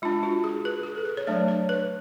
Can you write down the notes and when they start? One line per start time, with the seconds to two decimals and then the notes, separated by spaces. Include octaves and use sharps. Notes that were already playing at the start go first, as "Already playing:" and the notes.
0.02 G#3 D4 F4
0.23 F#4
0.44 G#4
0.65 B4
0.83 G#4
0.95 A4
1.05 B4
1.17 C#5
1.27 F#3 A3 D4 D5
1.48 C#5
1.69 B4